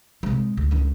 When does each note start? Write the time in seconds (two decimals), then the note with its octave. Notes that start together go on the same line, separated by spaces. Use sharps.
0.23 C3 G#3
0.57 D2
0.71 C#2 D#3